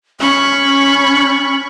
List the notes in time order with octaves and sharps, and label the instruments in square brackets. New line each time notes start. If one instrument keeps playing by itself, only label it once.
[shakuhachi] C#4 [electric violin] B5 C#6